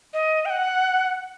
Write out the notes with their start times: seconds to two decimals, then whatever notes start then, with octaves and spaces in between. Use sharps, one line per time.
0.14 D#5
0.45 G5
0.50 F#5